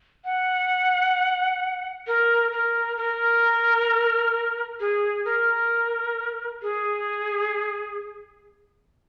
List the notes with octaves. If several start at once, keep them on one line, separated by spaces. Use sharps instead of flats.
F#5
A#4
A#4
A#4
G#4
A#4
G#4